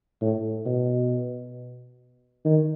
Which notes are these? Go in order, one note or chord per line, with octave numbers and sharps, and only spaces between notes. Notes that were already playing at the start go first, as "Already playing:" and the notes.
A2
B2
D#3